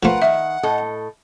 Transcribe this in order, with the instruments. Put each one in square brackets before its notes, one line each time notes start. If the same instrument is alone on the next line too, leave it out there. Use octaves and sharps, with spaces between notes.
[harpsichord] F3 A3 [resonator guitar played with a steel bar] F4 A#4 B4 [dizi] F#5
[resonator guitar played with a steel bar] D#3 [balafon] E5
[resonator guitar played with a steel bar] A2 A4 D#5